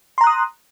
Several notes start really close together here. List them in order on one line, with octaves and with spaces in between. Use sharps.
C6 A#5 F#6 D#6